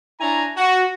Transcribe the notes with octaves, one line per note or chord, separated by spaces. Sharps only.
D4 E4 C#5 G#5 A#5
F#4